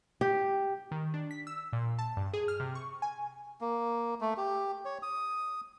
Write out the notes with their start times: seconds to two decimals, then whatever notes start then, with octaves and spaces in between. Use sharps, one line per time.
0.21 G4
0.91 D#3
1.14 D4
1.31 B6
1.47 E6
1.73 A#2
1.99 A5
2.17 G2
2.33 G#4
2.48 F6
2.60 C3
2.75 C#6
3.02 G#5
3.61 A#3
4.21 A3
4.37 G4
4.85 C#5
5.03 D#6